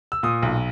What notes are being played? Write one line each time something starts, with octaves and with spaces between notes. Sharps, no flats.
E6
A#2 D#6
B1